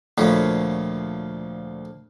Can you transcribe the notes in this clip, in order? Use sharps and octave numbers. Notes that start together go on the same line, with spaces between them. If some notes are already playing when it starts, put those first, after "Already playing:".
D2 A#2 F3 A3 C#5 B5